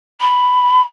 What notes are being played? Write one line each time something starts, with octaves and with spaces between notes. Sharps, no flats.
B5